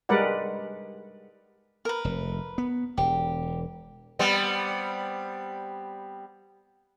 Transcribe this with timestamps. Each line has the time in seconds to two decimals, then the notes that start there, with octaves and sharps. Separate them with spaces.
0.09 G3 G#3 A#4 B4 D5 F#5
1.85 A#4 B4
2.05 F1
2.58 B3
2.98 E1 G4
4.19 G3 B3 C4